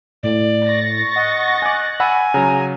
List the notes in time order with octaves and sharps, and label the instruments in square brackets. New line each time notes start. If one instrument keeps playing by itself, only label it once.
[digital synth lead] A2 [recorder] D5
[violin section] C#6 A6 A#6
[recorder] D#5 [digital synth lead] F#5
[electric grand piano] G#5 D6 [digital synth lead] F#6
[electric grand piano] F#5 B5 E6 [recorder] G#5
[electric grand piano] C#3 F#3 [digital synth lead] A#5